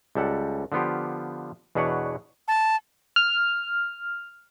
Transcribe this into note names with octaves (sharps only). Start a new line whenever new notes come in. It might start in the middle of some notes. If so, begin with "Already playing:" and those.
C#2 G3 A4 F#5
D3 F3 B3 F4 G4
E2 B2 D4 B4 C#5 F#5
A5
F6